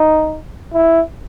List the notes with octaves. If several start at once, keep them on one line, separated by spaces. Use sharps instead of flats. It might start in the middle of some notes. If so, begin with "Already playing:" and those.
Already playing: D#4
E4